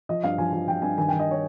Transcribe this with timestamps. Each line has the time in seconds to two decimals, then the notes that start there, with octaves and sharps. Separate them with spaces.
0.09 F3 D#5
0.23 G2 F5
0.38 F3 G#5
0.52 F3 G#5
0.68 F3 G5
0.82 G2 G#5
0.97 D#3 G#5
1.09 D#3 G5
1.19 D#5
1.31 C#5